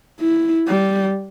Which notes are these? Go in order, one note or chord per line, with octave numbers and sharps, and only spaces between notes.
E4
G3